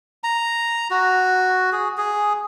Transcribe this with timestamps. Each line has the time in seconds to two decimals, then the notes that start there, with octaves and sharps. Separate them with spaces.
0.24 A#5
0.90 F#4
1.72 G#4
1.97 G#4